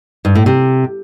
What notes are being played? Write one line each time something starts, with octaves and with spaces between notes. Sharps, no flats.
G2
A2
C3